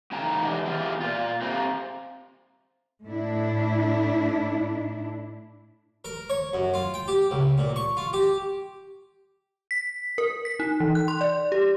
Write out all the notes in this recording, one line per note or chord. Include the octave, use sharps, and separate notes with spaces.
A2 C#3 D#4 G5 A#5
D3 E3 G#3 D4 G4
E3 G#3 B3 C#4 F4 G4
A#2 F4
A3 C4 G4 C5 F5 A#5
A2 D4 E4
A#4
C#5
F#2
F4
G5
G4
C#2
A#2
C#6
F4
G4
B6
A#4
B6
D#4
E3
F#6
C6
D5
G4